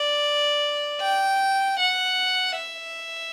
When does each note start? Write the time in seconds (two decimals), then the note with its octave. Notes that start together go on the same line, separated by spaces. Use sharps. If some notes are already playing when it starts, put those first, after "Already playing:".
Already playing: D5
1.01 G5
1.80 F#5
2.58 E5